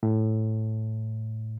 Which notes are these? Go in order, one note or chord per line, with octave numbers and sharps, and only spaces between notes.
A2